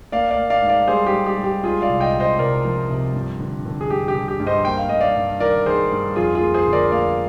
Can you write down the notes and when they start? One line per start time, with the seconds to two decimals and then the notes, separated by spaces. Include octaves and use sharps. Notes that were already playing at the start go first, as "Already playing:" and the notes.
0.12 A#3 D5 F5
0.31 D5 F5
0.37 A#3
0.50 D5 F5
0.62 G#2
0.68 D5 F5
0.88 G3 G#4 C5
1.06 G4
1.13 G3
1.26 G4
1.38 G3
1.44 G4
1.63 G#3 F4 G#4
1.82 D5 F5
1.89 C2
2.01 D#5 G5
2.14 C3
2.20 C5 D#5
2.38 C2 A#4 D5
2.65 F3
2.90 C3
3.14 G2
3.39 D3
3.65 D3
3.81 G#4
3.90 G2 G4
4.08 G4
4.15 D3
4.28 G4
4.40 G2
4.46 C5 D#5
4.65 A#3 G5
4.77 F5
4.89 G2 D#5
5.01 D5 F5
5.16 G2
5.40 D#3 A#4 D5
5.66 D#3 G#4 C5
5.91 G2
6.16 F2 F4 G#4
6.35 F4 G#4
6.41 A#3
6.54 G#4 C5
6.67 D3
6.73 A#4 D5
6.92 A#3 D5 F5